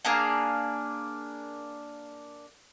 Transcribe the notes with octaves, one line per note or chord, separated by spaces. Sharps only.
A#3 D4 G#4 F5